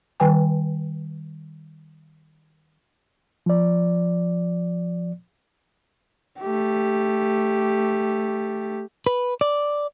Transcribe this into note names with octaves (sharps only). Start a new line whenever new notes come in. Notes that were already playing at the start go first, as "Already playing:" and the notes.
D#3 G3 B4 G5 G#5
F3 D5
A3 G4
B4
D5